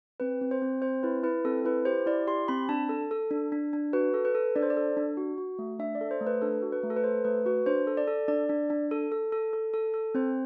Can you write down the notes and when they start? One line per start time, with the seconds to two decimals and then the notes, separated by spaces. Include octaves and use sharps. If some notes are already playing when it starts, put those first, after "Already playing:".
0.20 C4 B4
0.41 C4
0.51 C5
0.62 C4
0.82 C4 C5
1.03 E4 B4
1.23 E4 B4
1.44 C4 A4
1.65 E4 B4
1.85 G4 C5
2.06 E4 D5
2.27 G4 C6
2.48 C4 B5
2.69 D4 A5
2.89 A4
3.11 A4
3.31 D4
3.52 D4
3.73 D4
3.93 F#4 B4
4.14 A4
4.25 B4
4.35 A4
4.55 D4 D5
4.63 C5
4.70 D5
4.77 A4
4.97 D4
5.17 F#4
5.38 F#4
5.59 A3
5.79 D4 E5
5.95 D5
6.01 A4
6.11 C5
6.21 A3
6.27 B4
6.41 D4 A4
6.62 F#4
6.72 B4
6.83 A3
6.90 A4
6.96 B4
7.04 A4 C5
7.25 A3 B4
7.46 F#4 B4
7.66 D4 C5
7.87 A4
7.97 D5
8.07 A4
8.28 D4 D5
8.49 D4
8.70 D4
8.91 A4
9.12 A4
9.32 A4
9.53 A4
9.74 A4
9.94 A4
10.15 C4 C5